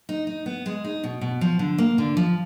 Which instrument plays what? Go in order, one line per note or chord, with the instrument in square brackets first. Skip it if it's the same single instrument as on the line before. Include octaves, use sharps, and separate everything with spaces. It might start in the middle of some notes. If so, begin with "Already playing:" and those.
[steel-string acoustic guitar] D#4
D#4
B3
G#3
D#4
B2
B2
F3
D3
A#3
D3
F3